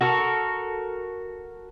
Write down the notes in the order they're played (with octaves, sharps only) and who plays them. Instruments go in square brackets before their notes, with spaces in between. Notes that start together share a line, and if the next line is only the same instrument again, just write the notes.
[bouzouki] F#4 A4 A#4